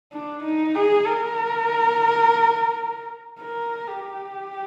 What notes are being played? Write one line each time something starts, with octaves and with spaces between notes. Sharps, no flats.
D4
D#4
G#4
A#4
A#4
G4